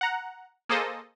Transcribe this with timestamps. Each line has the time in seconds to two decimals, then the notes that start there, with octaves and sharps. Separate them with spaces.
0.01 F#5 A#5
0.69 A#3 G#4 A4 C5 D#5